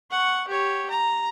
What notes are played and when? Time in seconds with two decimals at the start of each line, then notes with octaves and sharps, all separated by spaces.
0.11 F#5 C#6
0.48 G4 C#5
0.90 A#5